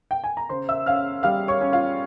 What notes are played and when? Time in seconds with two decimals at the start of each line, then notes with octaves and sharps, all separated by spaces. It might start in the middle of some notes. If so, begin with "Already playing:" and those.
0.11 G5
0.24 G#5
0.37 A#5
0.49 C#3 C5 C6
0.69 E5 E6
0.86 C#4 F5 F6
1.23 G3 F5 F6
1.48 C#5 C#6
1.61 C#4
1.72 F4 F5